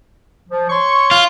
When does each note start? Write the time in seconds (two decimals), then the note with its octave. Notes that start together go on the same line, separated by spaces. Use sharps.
0.50 F3
0.70 C#5 C6 C#6
1.11 F4